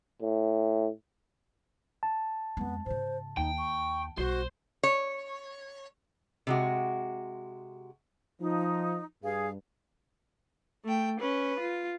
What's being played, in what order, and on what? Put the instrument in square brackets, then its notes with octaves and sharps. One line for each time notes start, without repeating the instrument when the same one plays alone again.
[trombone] A2
[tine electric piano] A5
[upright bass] F2 G#3 [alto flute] B3
[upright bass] G#2 C#3 [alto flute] C5
[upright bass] D#2 [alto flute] D#4 [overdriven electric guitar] G5
[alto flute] C#6
[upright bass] B1 G3 [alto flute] F#4 [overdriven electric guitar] C5
[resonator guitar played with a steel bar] C#5
C3 G#3 F#4
[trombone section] F3 [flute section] D#4
[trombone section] G2 [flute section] G#4 F5
[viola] A3 G5
C#4 B4
F4